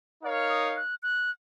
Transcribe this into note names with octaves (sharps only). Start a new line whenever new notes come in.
D#4 A#4 C#5 F5
D#6
F#6
F#6